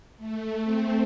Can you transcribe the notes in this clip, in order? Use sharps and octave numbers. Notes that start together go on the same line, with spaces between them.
A3
C4